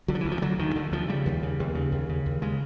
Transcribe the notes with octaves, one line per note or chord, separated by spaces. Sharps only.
D3 F#3
F3
D2 E3
F3
D3 F#3
D2 D#3
D3
D2 F3
C#3 G3
D#2
C#3
D#2
C#3
D#2
C#3
D#2
C#3 G#3